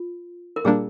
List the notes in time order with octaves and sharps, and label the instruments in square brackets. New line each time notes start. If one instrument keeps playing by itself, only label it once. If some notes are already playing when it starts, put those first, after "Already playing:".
Already playing: [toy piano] F4
A#4
[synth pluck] A#2 G3 A#3 D4 [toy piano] G#4